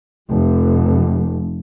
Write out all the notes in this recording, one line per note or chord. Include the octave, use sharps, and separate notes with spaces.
F1